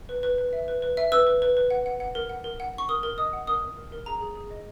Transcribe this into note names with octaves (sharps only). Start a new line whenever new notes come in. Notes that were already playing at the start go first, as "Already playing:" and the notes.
B4
B4
B4
E5
B4
B4
E5
B4 E6
B4
B4
B4
F#5
F#5
F#5
A#4
F#5
A#4
F#5
F#5 C#6
A#4 D#6
A#4
D#5 D#6
F#5
A#4 D#6
A#4
A#4
A#4
G#4 A#5
G#4
G#4
D#5